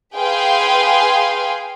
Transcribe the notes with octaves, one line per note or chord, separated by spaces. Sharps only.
G#4 B4 F5 G5 G#5 C6